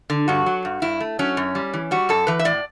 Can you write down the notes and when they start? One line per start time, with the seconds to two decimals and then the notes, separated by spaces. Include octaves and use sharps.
0.10 D3
0.28 G2 F#4
0.46 F#3
0.65 G2
0.82 G2 E4
1.01 A3
1.19 F#3 C#4
1.37 F#2
1.55 G3
1.74 E3
1.91 G3 F#4
2.09 F#2 A4
2.27 E3 B4
2.39 E5
2.45 A2 D5